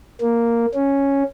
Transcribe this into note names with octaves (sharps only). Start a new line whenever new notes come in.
A#3
C#4